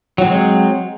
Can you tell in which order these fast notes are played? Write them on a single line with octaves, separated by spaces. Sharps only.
F#3 C4 G#3